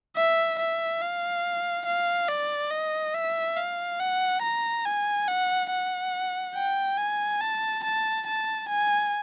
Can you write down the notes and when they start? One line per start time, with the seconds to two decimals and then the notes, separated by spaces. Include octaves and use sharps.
0.16 E5
0.59 E5
1.01 F5
1.86 F5
2.29 D5
2.71 D#5
3.14 E5
3.57 F5
4.00 F#5
4.42 A#5
4.85 G#5
5.28 F#5
5.70 F#5
6.55 G5
6.97 G#5
7.41 A5
7.84 A5
8.27 A5
8.69 G#5